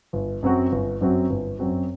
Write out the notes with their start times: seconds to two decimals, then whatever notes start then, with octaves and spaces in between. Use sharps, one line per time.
0.13 G1
0.43 F#2 F#3 C4 F#4
0.72 G1
1.01 F#2 F#3 C4 F#4
1.30 G1
1.59 F#2 F#3 C4 F#4